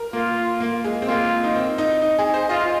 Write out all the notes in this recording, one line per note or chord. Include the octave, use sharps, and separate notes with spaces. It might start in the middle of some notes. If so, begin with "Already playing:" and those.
Already playing: A#4
A#3 F4
A#3
G#3
C4
A#3 F4
D#4
C4
D#4
D#4
G#4
C5
F4 D#5